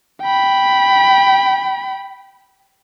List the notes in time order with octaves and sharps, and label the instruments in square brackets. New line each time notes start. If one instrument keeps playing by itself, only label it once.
[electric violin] G5 B5